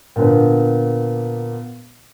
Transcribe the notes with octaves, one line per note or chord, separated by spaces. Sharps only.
A#2 D3 B3